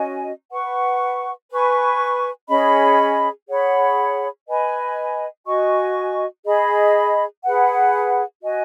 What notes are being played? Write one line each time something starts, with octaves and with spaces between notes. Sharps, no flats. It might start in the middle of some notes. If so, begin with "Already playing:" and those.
Already playing: C#4 F#4 D#5 G#5
B4 F#5 C#6
B4 G#5 C#6
C#4 G#4 D#5 B5
G#4 C#5 F#5 B5
B4 D#5 G#5 B5
F#4 D#5 G#5 C#6
G#4 D#5 B5
G#4 B4 F#5
F#4 D#5 G#5